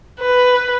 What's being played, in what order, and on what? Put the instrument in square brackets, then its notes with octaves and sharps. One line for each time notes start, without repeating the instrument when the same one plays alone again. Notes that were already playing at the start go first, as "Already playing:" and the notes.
[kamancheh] B4